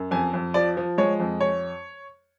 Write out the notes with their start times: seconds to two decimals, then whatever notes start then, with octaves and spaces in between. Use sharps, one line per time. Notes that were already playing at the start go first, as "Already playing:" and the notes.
Already playing: F#2
0.11 F2 G#5
0.33 F2
0.54 F3 D5
0.77 F3
0.98 G#3 C#5
1.20 F2
1.41 C#5